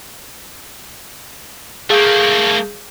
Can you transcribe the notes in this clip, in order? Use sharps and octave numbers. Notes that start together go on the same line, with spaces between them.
A3 A#3 G#4 F5 G6